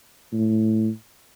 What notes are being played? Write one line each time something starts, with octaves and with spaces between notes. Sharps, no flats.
A2